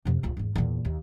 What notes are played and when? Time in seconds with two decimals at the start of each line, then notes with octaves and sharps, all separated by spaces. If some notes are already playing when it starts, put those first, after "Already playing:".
0.05 F2 C3
0.23 D1 F4
0.37 G#1 E2
0.56 E2 A#2
0.85 D#2